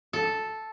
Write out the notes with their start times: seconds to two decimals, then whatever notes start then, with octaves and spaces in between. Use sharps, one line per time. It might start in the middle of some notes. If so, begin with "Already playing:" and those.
0.13 A4